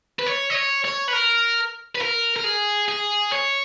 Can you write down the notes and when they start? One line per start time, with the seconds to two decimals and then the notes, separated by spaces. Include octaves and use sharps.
0.19 B4
0.26 C#5
0.50 D#5
0.55 C#5
0.85 C#5
1.08 B4
1.13 A#4
1.95 B4
2.02 A#4
2.36 A#4
2.44 G#4
2.89 G#4
3.32 C#5